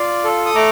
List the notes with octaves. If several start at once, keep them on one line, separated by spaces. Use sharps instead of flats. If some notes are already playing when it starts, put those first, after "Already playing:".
Already playing: F4 D5 F5
A4
D#6
A3 A#5 D6